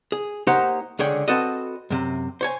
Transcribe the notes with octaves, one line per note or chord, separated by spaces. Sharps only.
G#4
A#3 D#4 G4 C5 C#5 F#5
C#2 D3 G#4 C#5 G5
C4 F#4 A4 B4 D#5
F#2 C3
C5 C#5 G#5